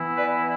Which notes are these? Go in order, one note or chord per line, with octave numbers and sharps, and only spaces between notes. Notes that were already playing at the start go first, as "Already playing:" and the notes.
Already playing: E3 B3 E4
B4 D5